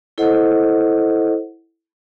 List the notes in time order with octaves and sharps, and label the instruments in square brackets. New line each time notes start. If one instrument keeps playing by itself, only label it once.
[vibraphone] E4 A4 C5 D#5 F#5